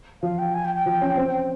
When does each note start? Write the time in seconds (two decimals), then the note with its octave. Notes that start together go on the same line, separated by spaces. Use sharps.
0.23 F3 F5
0.39 G5
0.54 G#5
0.65 G5
0.75 G5
0.86 F3
1.01 C#4
1.17 C4